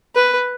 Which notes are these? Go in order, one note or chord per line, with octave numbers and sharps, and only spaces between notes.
B4